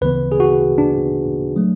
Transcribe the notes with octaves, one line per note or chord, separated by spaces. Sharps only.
D2 C#3 E3 B3 B4
G#4
F#4
D4
F#3 A3